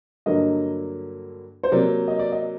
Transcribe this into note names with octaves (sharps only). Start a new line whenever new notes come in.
G2 D3 F#3 A#3 D#5
C5
C3 F#3 A#3 D5
D#5
D5
D#5